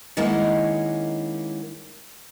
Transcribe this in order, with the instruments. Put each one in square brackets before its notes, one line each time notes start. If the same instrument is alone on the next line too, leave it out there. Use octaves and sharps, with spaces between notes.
[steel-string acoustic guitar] D#3 G#3 A#3 C#4 E4 F#5